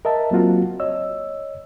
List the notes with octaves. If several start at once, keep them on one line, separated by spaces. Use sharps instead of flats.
A#4 D#5 E5 A5
F#3 A#3 C4 F4 F#4
C#5 D#5 E6